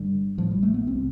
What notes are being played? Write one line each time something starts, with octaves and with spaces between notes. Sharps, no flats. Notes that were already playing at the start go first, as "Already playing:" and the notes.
Already playing: G1 G2 D3 G3
A1 A2 F3
G3
A3
B3
C2 C3 C4